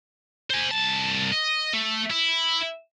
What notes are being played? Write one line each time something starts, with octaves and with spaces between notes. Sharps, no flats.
C5 G#5
C2 A5
D#5
A3
E4